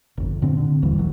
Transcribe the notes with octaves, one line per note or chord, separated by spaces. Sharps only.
G1 F2
A#2 D3 C4
D3
E1 D#2 E3 G3
D1 B1 D#3 F#3